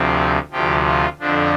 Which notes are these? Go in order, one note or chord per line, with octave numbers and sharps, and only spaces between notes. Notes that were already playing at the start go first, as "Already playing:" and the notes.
Already playing: D2 C3 F3 C4
D2 C3 F3 G4
F4
F2 D3 F3 D4